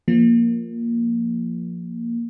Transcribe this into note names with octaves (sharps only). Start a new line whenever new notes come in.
F3 A#3